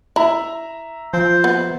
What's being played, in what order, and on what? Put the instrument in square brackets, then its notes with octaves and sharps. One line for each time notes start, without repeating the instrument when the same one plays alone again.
[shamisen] E4 [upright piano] E5 A#5
[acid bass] F3 [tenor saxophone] C5
[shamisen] B3